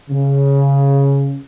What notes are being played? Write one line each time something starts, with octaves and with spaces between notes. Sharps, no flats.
C#3